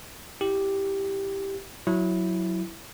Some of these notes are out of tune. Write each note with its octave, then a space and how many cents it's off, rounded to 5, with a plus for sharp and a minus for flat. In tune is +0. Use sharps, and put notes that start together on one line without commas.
E4 -10 G4 +0
F#3 +0 E4 +0